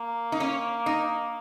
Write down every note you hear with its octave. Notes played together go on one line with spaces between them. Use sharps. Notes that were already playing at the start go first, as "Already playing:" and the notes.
Already playing: A#3
D#4
C#4
D#4